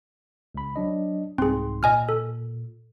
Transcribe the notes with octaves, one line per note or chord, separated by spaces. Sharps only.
C#2 B5
F#3 D4 D#5
C2 G#2 C4 G#4 C6
A#2 D#5 G#5 F6
A4